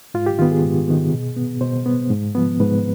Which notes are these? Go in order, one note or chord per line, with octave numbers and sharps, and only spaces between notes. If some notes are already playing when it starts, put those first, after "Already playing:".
G#2 F4
G4
D#3 B3 F4
G#4
G#2
D#3 B3
B2
B3
B2 C5
B3
G#2
F3 B3
G#2 B4